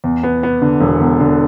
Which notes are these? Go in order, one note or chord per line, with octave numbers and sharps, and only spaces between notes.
E2
B3
B3
D3
E1
E2
D3